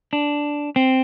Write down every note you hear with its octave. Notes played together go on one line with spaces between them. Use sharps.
D4
C4